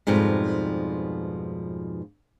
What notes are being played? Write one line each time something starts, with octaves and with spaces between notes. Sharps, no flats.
F2 G#2 B2 F3 G3